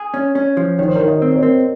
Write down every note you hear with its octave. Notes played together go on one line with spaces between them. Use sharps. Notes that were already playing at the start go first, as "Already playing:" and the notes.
Already playing: G#4
C#4
C#4
F3
D#3 C#5
C5
A#4 C#5
D#3
C5 D#5
C4
A#4 C#5
C4